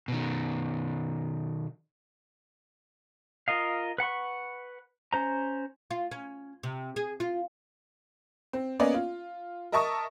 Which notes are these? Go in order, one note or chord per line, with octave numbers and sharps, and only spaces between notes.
B2 D#3
F4 A#4 D#5 F5
B4 F#5 B5 C#6
C#4 C5 A#5
F4
C#4
C3
G#4
F4
C4
A#3 B3 C#4 D5 D#5
F4
A#4 D#5 E5 A5 C#6 D#6